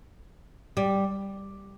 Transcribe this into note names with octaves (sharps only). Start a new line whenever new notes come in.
G3